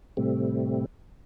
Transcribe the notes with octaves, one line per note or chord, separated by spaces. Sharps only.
A2 C3 G3 A3 C4